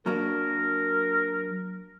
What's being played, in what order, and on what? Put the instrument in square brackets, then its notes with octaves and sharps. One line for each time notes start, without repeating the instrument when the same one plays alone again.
[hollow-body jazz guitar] F#3 A#3 D4 [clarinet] A#4